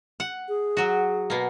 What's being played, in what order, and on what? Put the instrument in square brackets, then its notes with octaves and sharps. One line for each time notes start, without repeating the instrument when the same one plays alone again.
[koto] F#5
[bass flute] G#4
[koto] F#3 F#4
B2 A#3